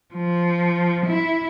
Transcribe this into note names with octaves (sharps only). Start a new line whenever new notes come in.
F3
E4